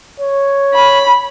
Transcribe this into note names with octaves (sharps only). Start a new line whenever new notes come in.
C#5
B5